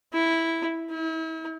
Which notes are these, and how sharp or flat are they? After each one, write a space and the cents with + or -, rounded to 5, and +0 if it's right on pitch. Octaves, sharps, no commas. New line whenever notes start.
E4 -5
E4 -40